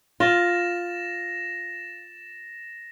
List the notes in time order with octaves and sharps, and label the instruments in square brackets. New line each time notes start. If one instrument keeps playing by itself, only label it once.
[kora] F4 [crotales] A6 A#6 E7